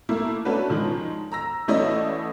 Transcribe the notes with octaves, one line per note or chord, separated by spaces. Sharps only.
A3 A#3 E4
A3 C#4 D4 F#4 B4
D#3 F3 G#3
A#5 E6 A#6
A1 A3 C#4 E4 D5 D#5